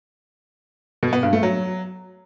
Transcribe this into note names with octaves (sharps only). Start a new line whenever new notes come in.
B2
B3
G2
A3
F#3